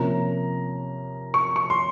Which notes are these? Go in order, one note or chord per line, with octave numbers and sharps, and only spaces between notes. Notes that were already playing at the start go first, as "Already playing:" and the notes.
Already playing: C3 F3 A#3 C#4 A#5
C#6
C#6
C6